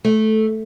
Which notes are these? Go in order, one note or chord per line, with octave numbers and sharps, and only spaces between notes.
A3